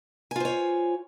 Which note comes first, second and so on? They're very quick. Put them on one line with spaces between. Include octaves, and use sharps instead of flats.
G#5 F4 C5 C#5